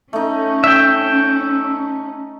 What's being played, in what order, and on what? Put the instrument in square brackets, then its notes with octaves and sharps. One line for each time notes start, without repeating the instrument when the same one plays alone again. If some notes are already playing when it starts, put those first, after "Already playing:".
[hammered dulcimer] A3 D#4 [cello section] C#4
[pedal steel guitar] E5 G5